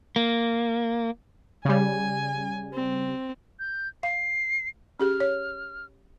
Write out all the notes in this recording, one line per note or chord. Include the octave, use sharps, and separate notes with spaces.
A#3
C#3 G3 G#5
C4
G6
F5 C7
C#4 G4 G#4 F6
C#5